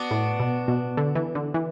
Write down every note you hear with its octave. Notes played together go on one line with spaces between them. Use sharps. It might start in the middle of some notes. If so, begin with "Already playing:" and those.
Already playing: B3 D4 F#4
A2
B2
B2
D3
E3
D3
E3